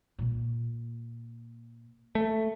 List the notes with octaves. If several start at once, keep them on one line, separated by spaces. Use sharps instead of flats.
A#2 A#3
A3